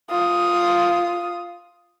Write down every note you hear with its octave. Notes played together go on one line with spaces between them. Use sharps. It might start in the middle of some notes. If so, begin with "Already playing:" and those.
F4 D#6